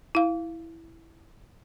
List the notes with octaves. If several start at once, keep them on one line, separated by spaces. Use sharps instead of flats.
E4 F5